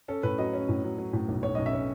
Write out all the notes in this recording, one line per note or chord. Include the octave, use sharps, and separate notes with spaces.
C#4 A4
A2 B4
F#3 D#5
C#4
A2
F#3
F#3
A2
B1
B1 C#5
D#5
B1
E5
C#4